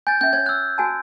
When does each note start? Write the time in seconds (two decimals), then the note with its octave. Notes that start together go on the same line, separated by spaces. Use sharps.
0.07 G#5 G6 A6
0.21 C#4 E5 G6
0.33 C#5 G#6
0.46 E6 F#6
0.78 F#4 G#5 A5